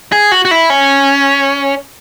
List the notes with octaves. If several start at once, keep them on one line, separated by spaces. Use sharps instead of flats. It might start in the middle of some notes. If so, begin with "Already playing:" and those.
G#4
F#4
F#4
E4
C#4